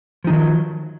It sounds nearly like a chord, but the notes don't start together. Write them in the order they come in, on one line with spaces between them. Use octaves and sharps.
F3 D#4 D#3 F#3